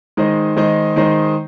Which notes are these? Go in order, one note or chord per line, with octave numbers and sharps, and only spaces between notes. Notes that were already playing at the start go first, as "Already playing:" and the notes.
D#3 G#3 D#4 C5 D#5
D#3 G#3 D#4 C5 D#5
D#3 G#3 D#4 C5 D#5